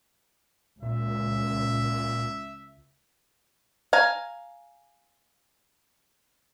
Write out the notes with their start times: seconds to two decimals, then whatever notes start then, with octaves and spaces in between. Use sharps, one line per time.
0.83 C#2 A#2 E5
3.93 F5 G#5 A#5